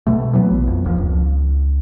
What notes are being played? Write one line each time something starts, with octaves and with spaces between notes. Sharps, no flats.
B2 A3
E3 F#3 B3
A#1
F2
D1 D#2 C#3 F3
C#2